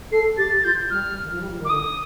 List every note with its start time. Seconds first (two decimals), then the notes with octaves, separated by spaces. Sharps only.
0.11 A4 C7
0.37 G4 A6
0.55 A6
0.64 F4 G6
0.90 G3 F6
1.24 D#3
1.31 F3
1.41 G3
1.50 F3
1.59 D#3
1.64 D6
1.69 D3 D#6